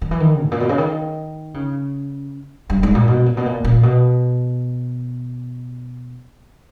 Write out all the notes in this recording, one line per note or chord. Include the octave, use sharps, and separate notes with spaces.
D#3
E3
D#3
G#2
A#2
B2
C#3
D#3
C#3
G2
G#2
A#2
B2
A#2
B2
A#2
A#2
B2